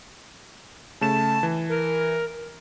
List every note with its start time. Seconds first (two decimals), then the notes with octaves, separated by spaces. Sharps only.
1.01 C#3 A3 A5 E7
1.43 E3
1.69 A#4